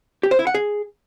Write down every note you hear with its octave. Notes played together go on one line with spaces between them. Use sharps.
G4
C5
E4
F#5
G#4